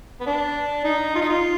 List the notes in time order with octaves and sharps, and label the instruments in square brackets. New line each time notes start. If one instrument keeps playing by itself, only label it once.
[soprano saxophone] B3
D4
D#4
F4
D#4
F4